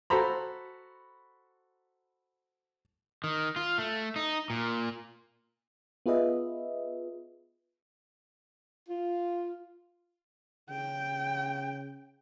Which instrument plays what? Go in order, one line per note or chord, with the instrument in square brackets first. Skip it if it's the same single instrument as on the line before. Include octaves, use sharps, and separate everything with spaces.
[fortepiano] F#4 A4 C5 A#5 B5
[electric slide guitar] D#3
F4
A3
D#4
A#2
[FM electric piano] B3 F4 G#4 B4 D#5 E5
[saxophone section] F4
[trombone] C#3 [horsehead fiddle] G5